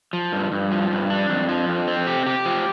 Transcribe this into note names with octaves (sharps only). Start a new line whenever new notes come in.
F3
G2
G2
F3
G2
D4
F2
F3
F2
C4
G4
G4
F3